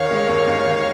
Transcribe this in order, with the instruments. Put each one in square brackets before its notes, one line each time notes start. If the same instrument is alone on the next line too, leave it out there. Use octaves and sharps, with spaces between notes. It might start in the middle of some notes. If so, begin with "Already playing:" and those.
Already playing: [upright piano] D#2 D#3 [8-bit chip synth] C#5 F5
[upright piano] G#3
D#2
D#2
D#3